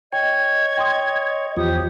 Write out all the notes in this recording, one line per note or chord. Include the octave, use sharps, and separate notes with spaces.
C#5 D#5 G5 G#6
G5 C6 D#6
E2 F3 F4 G4 D#6